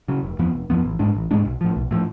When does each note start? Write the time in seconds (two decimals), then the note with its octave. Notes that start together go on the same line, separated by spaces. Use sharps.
0.08 C#3 F#3
0.23 F1
0.39 F2 F3 B3
0.53 F1
0.70 F2 F3 B3
0.84 A1
0.99 G#2 G#3 D4
1.15 A1
1.31 G#2 G#3 D4
1.45 B1
1.61 A2 F3
1.76 B1
1.91 A2 F3